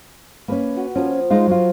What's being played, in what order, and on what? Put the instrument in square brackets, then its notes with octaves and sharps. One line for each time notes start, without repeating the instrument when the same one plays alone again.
[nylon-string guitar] A#3 C4 C#4 [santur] B4
[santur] F#4
[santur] F3 A#3 [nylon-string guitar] C#4
[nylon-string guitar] G#3 D#4 F4 [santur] C5 D6
[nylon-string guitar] F#3 F4